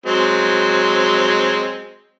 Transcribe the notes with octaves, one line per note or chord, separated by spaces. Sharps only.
F#3 G#3 C4